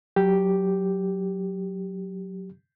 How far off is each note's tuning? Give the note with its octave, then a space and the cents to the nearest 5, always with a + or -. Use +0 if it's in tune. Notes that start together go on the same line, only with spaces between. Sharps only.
F#3 +0 G4 +0